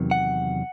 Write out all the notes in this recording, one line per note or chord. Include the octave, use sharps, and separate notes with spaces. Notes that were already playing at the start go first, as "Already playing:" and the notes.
Already playing: E2 C3 D#3 F#3
F#5